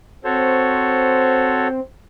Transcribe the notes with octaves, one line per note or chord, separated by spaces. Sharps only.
C4 F#4 A4 C5 C#5